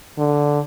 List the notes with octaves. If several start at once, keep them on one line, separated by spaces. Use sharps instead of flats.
D3